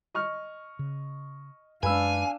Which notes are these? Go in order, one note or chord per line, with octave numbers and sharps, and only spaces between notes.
D#5 C#6 F6
C#3
F#2 G#3 D4 B4 F5 G#5 B5 E6